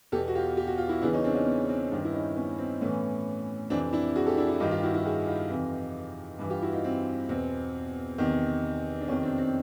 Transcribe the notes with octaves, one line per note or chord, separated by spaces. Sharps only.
E2 B2 G4 A4
F#4
F4 G4
G4
F#4
F4
E4 F#4
E2 C#3 E3 D4 E4
C#4 D#4
C4 D4
C#4 D#4
B3
C4
G2 D#3 C4 D4
E4
C#4 D#4
B3 C#4
C4
A2 E3 B3 C#4
F2 C3 E3 C4 D4
D4 E4
F#4 G#4
G4 A4
D4 E4
D4 E4
G2 D#3 D#4 F4
F4 G4
E4 F#4
E4 F#4
F#4 G#4
D#4 F4
F2 C3 E3
G2 E3
F4 G4
E4 F#4
D#4 F4
C4
E2 B2 C4
E2 C3 D#3
D4
F2 C3 D#3 B3 C#4
C4 D4
C4